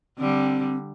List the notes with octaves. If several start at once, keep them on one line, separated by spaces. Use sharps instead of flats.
D3 G3 C4